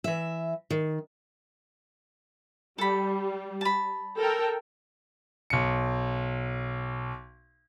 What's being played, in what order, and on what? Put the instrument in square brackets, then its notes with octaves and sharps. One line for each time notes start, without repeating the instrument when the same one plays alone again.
[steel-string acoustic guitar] E3 E5
D#3
[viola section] G3 [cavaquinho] A4 B5
[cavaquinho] A5 B5
[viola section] A4 A#4 G5
[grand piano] B1 C#7